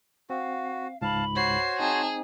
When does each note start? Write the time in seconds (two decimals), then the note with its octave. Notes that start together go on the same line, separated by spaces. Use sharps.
0.30 C4 F#4 F5
1.02 C#2 G#2 F5 A5 B5
1.36 F#4 C5 C#5 C7
1.80 C4 D#4 G#4 A5